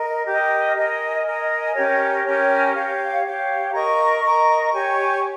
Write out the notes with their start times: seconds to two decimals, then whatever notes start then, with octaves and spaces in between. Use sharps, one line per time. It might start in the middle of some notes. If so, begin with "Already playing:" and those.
Already playing: A#4 D#5
0.27 G4 A#4 D#5
0.76 A#4 D#5 G#5
1.26 A#4 D#5 G#5
1.75 C#4 G4 A#4 C#5
2.24 C#4 G4 A#4 C#5
2.74 G4 C#5 F5
3.24 G4 C#5 F5
3.73 A#4 D#5 A#5 C#6
4.22 A#4 D#5 A#5 C#6
4.72 G4 C#5 G#5 C#6